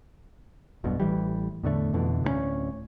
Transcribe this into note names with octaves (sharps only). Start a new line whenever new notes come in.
E1 B1 G2 B2
A1 E3 G3
E2 A2 D3 A3
F2 B2 D3 E3
D1 D2 G3 C#4